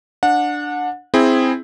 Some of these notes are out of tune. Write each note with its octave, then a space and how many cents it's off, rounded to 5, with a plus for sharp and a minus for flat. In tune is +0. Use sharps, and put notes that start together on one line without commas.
D4 +10 F#5 -25
C4 +0 E4 +0 G#4 +0